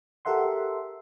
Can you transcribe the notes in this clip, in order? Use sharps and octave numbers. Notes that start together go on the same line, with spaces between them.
G4 A4 A#4 E5 F#5 C6